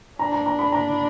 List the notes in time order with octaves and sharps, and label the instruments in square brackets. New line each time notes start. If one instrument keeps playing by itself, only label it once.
[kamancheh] D4 [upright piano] A#5
[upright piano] A#5
A#5
B5
A#5